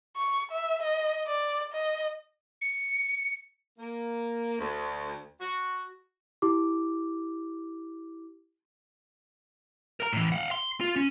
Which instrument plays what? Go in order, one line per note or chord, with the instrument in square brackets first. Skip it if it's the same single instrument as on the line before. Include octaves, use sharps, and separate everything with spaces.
[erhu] C#6
E5
D#5
D5
D#5
[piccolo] C#7
[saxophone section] A#3
D2
F#4
[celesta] E4 G4 D6
[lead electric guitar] A#4 A#5
A2 E3
F5 F#5
C6
F4
C#4